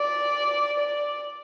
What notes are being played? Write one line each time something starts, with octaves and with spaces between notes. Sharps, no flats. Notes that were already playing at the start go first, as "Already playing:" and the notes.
Already playing: D5
D5